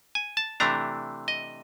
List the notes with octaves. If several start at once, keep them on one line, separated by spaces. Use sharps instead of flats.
G#5
A5
C3 E3 A3 D4 A#5
D#5